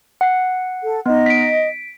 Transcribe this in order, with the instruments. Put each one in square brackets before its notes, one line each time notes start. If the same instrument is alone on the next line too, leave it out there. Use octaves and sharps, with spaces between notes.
[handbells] F#5 C7
[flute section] A4
[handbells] B3 D#4 [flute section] D#5
[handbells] B6 D7